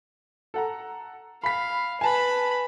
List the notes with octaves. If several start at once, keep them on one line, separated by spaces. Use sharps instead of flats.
A4 F#5 A#5
F5 B5 B6
B4 G#5 A5 B5